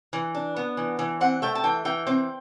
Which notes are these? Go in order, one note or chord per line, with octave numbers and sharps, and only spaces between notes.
E3
D4
B3
E3
E3
C4 F#5
A3 G5
A5
E3 G5
E3 G5
C4 G5